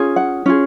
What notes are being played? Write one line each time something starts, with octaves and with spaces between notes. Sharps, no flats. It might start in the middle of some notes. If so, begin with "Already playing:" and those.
Already playing: C#4 F4 G#4
F#5
C#4 F4 G#4